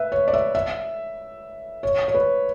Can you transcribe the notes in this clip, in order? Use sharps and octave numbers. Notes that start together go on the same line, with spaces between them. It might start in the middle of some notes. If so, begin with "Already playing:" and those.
Already playing: B4 E5
C#5
D5
E5
E5
C#5
C#5
B4